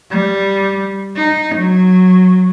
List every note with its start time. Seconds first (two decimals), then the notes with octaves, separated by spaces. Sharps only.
0.10 G3
1.16 D#4
1.55 F#3